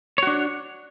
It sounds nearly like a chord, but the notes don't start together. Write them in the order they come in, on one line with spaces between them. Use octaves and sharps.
C#5 F#4 D4